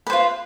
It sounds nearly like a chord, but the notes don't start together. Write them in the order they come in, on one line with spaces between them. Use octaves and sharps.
B4 C5 F4